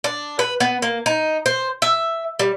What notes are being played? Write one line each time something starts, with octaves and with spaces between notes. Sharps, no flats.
D4
B4
B3
A#3
D#4
C5
E5
G3